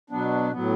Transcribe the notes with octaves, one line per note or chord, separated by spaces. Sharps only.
B2 F#3 B3 D4
A2 F#3 B3